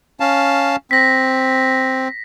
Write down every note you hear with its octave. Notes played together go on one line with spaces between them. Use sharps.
C#4 F5 A5
C4 A#6 B6